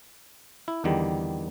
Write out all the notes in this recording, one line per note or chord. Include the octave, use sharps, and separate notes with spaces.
E4
E2 D3 D#3 G3